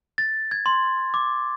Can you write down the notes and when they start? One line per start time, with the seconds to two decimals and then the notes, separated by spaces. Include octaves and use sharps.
0.18 A6
0.51 G#6
0.66 C6
1.14 D6